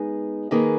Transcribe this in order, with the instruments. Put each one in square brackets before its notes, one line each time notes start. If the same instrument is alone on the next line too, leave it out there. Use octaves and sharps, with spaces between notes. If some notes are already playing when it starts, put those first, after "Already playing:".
Already playing: [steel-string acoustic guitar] G#3 B3 D#4 G#4
D#3 A#3 D#4 G#4 B4